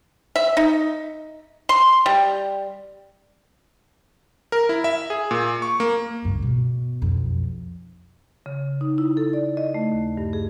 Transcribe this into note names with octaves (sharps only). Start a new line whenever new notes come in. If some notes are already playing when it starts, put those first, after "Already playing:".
E5
D#4
C6
G3
A#4
E4
E5
G#4
A#2
C#6
A#3
C#2 G2
B2
B1 F2
C#3
D#4
E4
A4
D5
D#5
A3
D#2
G2
G#4